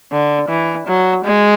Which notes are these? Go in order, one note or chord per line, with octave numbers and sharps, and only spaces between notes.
D3
E3
F#3
G#3